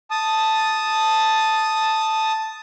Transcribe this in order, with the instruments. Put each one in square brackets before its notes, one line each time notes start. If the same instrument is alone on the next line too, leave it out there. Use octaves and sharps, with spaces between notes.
[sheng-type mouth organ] A5 D#6